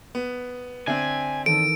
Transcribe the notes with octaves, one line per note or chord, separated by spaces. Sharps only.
B3
D3 C4 D4 E5 G#5
D#3 E3 A4 D7